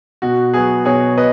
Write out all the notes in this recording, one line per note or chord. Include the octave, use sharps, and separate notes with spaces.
B2 F#4
F#3 B3 G#4
B2 G#4 C#5
B3 B4 D#5